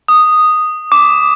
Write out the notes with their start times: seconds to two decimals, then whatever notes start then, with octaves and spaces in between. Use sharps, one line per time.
0.08 D#6
0.92 D6